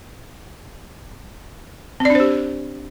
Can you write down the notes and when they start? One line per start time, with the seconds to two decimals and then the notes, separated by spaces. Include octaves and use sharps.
2.00 C4
2.05 D5
2.10 D4
2.15 C5
2.20 G4